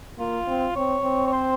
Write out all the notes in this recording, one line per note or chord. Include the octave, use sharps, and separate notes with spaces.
A#3 F4
C4
C4 C#5
C4
C#5
C5